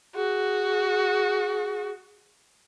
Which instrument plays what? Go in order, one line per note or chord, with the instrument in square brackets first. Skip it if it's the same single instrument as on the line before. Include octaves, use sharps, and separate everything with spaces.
[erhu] F#4 [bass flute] G#4